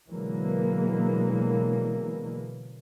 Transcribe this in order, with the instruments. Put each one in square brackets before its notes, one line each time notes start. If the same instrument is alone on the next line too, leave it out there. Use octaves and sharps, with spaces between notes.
[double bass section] B2 D3 E3 F#3 G#3 A#3